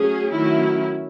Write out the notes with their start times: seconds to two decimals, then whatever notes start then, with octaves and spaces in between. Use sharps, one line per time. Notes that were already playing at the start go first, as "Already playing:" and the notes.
Already playing: F#3 A3 C#4 G#4
0.32 D#3 F#3 A3 C#4 E4